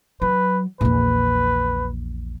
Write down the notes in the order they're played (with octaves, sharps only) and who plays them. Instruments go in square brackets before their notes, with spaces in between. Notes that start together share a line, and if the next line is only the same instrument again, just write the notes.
[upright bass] F#3 [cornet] B4
[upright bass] A#1 E2 [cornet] B4